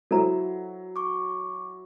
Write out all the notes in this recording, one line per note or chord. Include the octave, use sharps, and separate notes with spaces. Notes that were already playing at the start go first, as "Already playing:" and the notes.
F#3 E4 A4 C5 A#5
C#6 D6